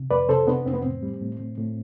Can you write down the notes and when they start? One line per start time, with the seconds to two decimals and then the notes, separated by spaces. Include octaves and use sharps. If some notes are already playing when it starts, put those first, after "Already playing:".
Already playing: C3
0.11 F2 B4 D5
0.29 C3 A4 C5
0.47 C3 B3 D4
0.66 F2 C4
0.74 B3
0.82 A2 C4
1.03 G3
1.21 A2
1.40 A2
1.58 A2